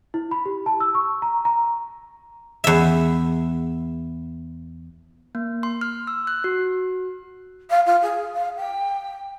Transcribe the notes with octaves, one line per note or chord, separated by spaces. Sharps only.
E4
B5
G4
A5
E6
C#6
A#5
A#5
E2 E5
A#3
C6
F6
E6
F#6
F#4
F5
F4
G#4
F5
G5